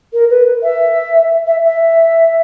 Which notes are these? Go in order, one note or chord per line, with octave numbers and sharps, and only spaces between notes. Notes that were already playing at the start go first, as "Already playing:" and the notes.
A#4
B4
E5
E5
E5